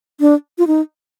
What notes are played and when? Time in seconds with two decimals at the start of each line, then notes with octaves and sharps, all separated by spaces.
0.20 D4
0.58 F4
0.67 D#4